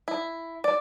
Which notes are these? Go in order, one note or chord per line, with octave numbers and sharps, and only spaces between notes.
E4
D5